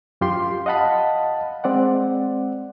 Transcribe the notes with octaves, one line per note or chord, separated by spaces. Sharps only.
F#2 F4 G4 C6
D#5 F5 F#5 A5 B5
G#3 C4 D5 F#5